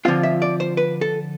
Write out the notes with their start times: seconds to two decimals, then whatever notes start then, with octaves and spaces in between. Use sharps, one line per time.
0.05 D3 F3 C4 F4 F5
0.23 E5
0.42 D5
0.60 C5
0.77 B4
1.01 A4